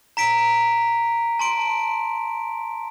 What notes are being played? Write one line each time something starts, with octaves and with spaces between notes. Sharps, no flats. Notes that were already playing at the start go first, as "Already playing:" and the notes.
A#5 B6 D7
A5 C6 D7